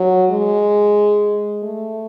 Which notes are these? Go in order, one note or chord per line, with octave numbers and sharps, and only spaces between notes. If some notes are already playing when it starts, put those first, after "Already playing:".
Already playing: F#3
G#3
A3